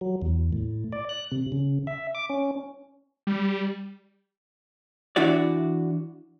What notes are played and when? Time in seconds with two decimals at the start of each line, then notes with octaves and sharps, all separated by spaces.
0.01 F#3
0.22 E2
0.53 A2
0.92 D5
1.09 F#6
1.32 C3
1.52 C#3
1.87 E5
2.15 D6
2.30 C#4
3.27 G3
5.16 E3 D4 E4 F#4 D5